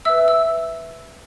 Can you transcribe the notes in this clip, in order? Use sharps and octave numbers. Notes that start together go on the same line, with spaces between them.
B4 E5 E6
E6